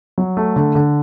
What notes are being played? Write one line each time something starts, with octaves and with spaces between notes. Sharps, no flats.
F#3
A3
D3
D3